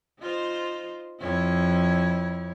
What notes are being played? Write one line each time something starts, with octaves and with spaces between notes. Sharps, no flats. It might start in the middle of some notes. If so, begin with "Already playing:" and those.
D#4 F4 C5
F2 E4 C#5